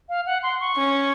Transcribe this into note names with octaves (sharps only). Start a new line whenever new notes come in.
F5
F#5
C6
C#6
C#4